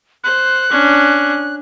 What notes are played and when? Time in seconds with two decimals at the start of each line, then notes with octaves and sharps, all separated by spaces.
0.24 C5 F#6
0.71 C#4 D4